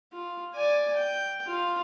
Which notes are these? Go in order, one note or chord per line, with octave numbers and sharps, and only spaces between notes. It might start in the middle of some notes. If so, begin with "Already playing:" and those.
F4
D5 G#5
G5
F4